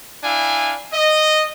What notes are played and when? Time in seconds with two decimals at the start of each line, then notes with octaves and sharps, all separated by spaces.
0.24 D4 E4 F5 G#5
0.93 D#5